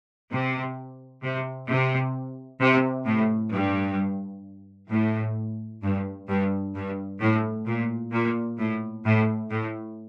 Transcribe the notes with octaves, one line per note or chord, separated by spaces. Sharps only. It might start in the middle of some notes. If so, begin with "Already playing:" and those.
C3
C3
C3
C3
A2
G2
A2
G2
G2
G2
A2
A#2
A#2
A2
A2
A2